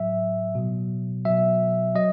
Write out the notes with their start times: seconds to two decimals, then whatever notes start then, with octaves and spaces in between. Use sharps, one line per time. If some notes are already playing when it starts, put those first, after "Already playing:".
Already playing: A2 F#3 E5
0.55 B2 F#3
1.25 B2 F#3 E5
1.95 F#3 D#5